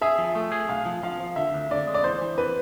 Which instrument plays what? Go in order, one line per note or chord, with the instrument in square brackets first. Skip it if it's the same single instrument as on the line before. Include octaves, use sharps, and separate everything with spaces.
[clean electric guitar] G#4 [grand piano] E5
[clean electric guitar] F3
A3
G#4
[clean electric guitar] B1 [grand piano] F5
[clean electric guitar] F3
[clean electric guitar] F3 [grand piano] F5
[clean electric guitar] F3
[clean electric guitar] D3 [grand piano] E5
[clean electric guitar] D2
[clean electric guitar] D3 [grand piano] D5
[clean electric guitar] G#3
[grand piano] D5
[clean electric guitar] E3 [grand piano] C5
[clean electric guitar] E3
[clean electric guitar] E3 [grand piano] B4